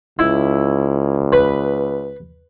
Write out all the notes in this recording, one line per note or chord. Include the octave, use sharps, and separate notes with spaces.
C#2 E4
B4